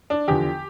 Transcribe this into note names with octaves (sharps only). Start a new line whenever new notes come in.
D4
E2 D3 F3 G4